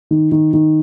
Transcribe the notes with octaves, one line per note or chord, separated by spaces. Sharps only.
D#3
D#3
D#3